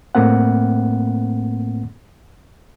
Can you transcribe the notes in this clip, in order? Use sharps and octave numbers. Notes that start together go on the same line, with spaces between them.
A2 A3 A#3 C4 F#5